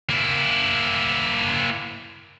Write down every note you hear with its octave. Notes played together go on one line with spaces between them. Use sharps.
A#3 E4